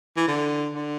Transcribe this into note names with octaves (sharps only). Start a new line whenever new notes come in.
E3
D3
D3